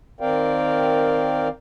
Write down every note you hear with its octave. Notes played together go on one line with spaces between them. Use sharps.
D#3 C4 A#4 D5 F5 G5